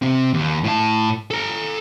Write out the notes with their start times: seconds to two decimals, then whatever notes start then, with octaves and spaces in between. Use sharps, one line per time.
0.02 C3 C4
0.34 D#2
0.64 A2 A5
1.31 A4 A#5